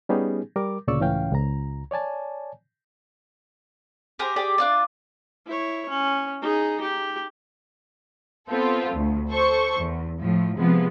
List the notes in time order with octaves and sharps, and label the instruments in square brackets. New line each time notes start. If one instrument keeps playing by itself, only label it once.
[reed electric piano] G3 B3 C#4 D#4 G4 G#4
G3 A#4 D6
D2 A#2 C#3 D5 C#6 E6
C#2 A2 E3 C#4 F5 G5
C#2 A#5
C#5 D5 G#5 A5
[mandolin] G4 G#4 A#4 C5
G4 G#4 D5
D4 F4 D5
[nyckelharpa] E4 C#5
C#4
D#4 G#4
G4
[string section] B3 C4 F4 A4
D2
A4 C5 C#6
E2
A2 F3
C3 F3 G#3 B3